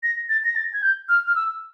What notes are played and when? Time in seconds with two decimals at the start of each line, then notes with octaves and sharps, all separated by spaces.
0.03 A#6
0.29 A6
0.44 A#6
0.56 A6
0.73 G#6
0.83 G6
1.09 F6
1.27 F6
1.35 E6